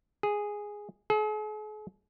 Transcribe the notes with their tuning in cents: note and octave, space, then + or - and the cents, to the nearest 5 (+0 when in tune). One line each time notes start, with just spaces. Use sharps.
G#4 -5
G#4 +45